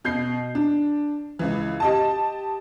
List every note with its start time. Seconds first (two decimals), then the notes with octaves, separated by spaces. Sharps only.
0.04 B2 G6 C7
0.55 D4
1.39 C#2 E3
1.80 G4 D#5 A5